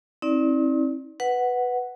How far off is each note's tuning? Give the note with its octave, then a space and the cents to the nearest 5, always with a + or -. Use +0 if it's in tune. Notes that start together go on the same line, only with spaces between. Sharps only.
C4 +35 D#4 +45 D5 +0
B4 +5 F#5 +0